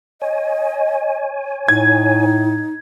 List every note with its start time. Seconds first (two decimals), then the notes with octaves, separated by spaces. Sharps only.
0.22 C#5 D#5 G#5
1.68 A2 D#4 G#6